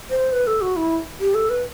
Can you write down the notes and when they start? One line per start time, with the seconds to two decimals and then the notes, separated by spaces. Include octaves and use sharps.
0.10 C5
0.32 B4
0.47 A4
0.61 F#4
0.76 E4
1.20 G4
1.34 A4
1.50 B4